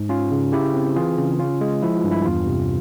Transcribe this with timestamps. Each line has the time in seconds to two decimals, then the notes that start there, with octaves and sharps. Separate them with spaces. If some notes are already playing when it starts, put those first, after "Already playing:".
Already playing: G#2
0.09 C#4 F4
0.32 C#3
0.53 C#3 E4 G4
0.74 C4
0.96 E3 F4 G#4
1.18 C#3
1.39 C#4 F4
1.61 G#3
1.83 F3 E4
1.97 F4
2.04 G2
2.11 E4
2.26 E2 F4
2.47 C3